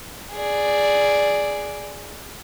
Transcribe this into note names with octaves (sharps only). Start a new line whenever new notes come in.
G#4 D5